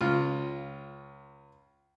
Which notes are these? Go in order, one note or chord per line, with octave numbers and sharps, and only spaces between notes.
C#2 F4